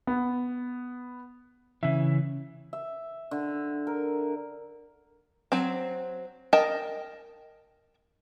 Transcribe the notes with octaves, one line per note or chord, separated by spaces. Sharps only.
B3
C#3 E3 E5
E5
D3
A#4
F#3 C4
A#4 D#5 G5 A5